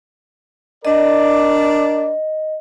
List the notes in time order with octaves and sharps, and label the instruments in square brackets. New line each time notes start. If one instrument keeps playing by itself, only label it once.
[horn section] D4 A#4 D5 [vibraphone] D#5